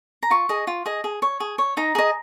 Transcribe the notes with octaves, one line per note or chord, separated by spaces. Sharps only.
A#5
F4 C#6
G#4 D#5
F4
G#4 D#5
G#4
C#5
G#4
C#5
D#4 A#5
G#4 D#5